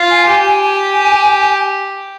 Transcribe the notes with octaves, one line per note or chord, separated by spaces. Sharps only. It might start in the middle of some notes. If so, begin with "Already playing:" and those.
Already playing: F4
G#5
G4 G#5
G#5
G#5